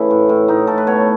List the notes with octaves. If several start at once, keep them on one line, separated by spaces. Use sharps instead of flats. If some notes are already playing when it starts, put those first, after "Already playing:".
Already playing: C#3 E3 A3 E4
A2
A2
A2 D#4
A2 A4
B4
B2 C#5